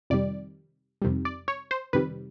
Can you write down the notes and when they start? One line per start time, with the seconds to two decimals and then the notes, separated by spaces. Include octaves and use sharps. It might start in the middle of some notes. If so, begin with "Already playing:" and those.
0.10 F2 C3 D#3 G3 D5
1.02 F2 C3 D#3 G3
1.25 D5
1.48 C#5
1.71 C5
1.93 F2 C3 D#3 G3 B4